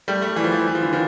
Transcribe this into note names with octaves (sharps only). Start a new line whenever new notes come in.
G3 A3
G3 A3
E3
F3
E3
F3
E3
F3
D3 E3
D#3 F3